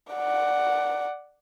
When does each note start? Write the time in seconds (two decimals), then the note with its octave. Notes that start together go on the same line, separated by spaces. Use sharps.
0.13 D5 F#5